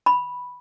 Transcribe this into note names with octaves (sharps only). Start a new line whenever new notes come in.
B5